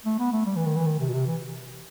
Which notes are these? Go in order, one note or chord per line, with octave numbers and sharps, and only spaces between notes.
A3
B3
A3
G3
E3
D#3
E3
D#3
C3
B2
C3
E3